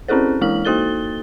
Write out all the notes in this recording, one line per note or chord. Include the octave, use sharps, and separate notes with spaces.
C4 C#4 E4 G#4 A4 C5
E3 G#3 E4 F6 F#7
A#3 D#4 F#4 A4 A6 G7